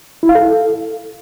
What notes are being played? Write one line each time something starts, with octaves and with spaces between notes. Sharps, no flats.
E4
F5
A4